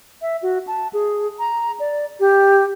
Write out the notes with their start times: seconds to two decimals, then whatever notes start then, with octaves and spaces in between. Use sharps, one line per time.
0.22 E5
0.42 F#4
0.67 A5
0.93 G#4
1.39 A#5
1.80 D5
2.20 G4